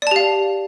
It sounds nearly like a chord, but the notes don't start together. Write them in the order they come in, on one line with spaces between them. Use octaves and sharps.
D5 A5 G4 F5